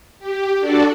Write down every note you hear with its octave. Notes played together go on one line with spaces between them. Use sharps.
G4
D4 F#4 A4 D5